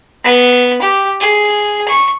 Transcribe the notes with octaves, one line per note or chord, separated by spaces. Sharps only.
B3
G4
G#4
C#6